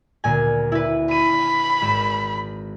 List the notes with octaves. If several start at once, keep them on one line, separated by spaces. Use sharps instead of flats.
D2 A#2 G#5
E4 B4
B5 D#7
G#1 E7